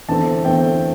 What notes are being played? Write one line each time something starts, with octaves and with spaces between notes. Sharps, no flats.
E2 D3 A3 C4 A5
E2 D3 A3 C4 G5